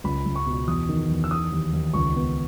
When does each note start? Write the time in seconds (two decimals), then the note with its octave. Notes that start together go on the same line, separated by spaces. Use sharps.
0.04 C#2 B5
0.26 C#2
0.35 C#6
0.46 B2
0.68 E2 D#6
0.89 D#3
1.10 E2
1.24 E6
1.30 D#3 D#6
1.52 D#2
1.73 D#2
1.94 C#2 C#6
2.16 B3